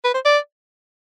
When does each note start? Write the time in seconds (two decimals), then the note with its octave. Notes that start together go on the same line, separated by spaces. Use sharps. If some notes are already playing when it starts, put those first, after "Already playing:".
0.04 B4
0.14 C5
0.25 D5